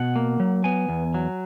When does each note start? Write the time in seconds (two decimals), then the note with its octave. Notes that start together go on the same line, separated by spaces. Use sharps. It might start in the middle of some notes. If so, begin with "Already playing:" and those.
Already playing: B2 F#5
0.16 A#3
0.40 F#3
0.64 B3 G#5
0.89 E2
1.14 F#3